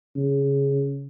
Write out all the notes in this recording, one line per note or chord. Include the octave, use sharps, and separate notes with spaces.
C#3